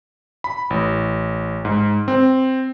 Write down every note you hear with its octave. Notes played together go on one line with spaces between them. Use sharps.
B5
A1
G#2
C4